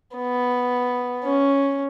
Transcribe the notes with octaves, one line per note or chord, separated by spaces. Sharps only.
B3
C#4